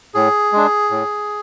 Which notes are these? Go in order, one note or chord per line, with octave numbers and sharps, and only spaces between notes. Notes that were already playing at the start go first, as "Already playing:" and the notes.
A2 G#4
G#3 D4
A2